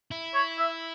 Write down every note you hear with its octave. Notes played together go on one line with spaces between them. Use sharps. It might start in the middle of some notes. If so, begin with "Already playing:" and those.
E4
C#5
E5